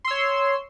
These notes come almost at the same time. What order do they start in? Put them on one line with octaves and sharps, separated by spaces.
C6 E6 C#5